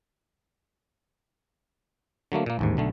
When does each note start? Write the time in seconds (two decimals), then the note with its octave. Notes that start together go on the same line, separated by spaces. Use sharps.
2.32 D3 F#3 A3 A#3
2.46 A#2 A#3
2.59 A1 D#2 G#2
2.77 B1 D3 A3